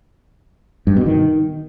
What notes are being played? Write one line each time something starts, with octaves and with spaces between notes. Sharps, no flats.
G2
B2
D#3